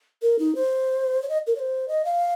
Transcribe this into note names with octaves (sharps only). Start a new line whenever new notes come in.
A#4
D#4
C5
C#5
D#5
A#4
C#5
C5
D#5
F5